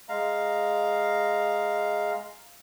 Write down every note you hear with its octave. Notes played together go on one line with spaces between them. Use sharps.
G#3 F5 A#5